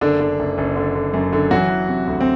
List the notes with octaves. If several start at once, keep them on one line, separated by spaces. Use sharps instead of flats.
F#1 D3 D4
D3
F#1
F#1
D3
D3
F#2
D3
E3 F#3 F#4
E3
C3
D2
C4